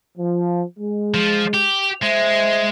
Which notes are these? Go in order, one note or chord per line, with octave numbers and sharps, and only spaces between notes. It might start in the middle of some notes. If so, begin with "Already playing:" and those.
F3
G#3
F3
G4
G#3 C5 E5